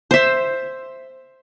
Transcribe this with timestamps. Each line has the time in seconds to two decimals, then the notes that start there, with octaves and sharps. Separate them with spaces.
0.11 C5 E5